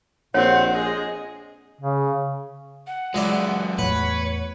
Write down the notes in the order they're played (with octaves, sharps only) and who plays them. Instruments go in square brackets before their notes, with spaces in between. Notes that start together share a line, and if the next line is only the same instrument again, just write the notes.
[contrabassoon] A#1 [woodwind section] D#2 A#2 F#5 [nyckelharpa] C4 C5 [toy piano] C#5
[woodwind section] G#3 D#5 [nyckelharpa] G#4
[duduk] C#3
[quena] F#5
[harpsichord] C#2 E4 D5 [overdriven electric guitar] F#3 G#3
[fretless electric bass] E2 A2 [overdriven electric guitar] B4 [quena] C#5 [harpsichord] F#5